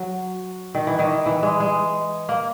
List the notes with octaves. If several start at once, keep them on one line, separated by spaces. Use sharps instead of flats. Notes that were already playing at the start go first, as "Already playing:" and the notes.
Already playing: F#3
D#3
E3
D#3
E3
G#3
G#3
A#3